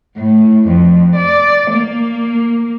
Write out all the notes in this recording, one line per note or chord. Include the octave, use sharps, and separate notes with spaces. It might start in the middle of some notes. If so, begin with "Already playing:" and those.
A2
F2
D5
A#3